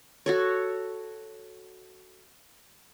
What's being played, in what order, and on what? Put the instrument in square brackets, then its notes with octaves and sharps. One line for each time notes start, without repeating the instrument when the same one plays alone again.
[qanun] F#4 A4 C#5